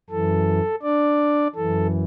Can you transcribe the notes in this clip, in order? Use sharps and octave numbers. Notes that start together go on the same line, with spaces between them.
F#2 E3 A4
D4 D5
F#2 E3 A4